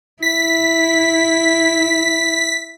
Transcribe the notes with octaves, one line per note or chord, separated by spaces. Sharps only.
E4 B6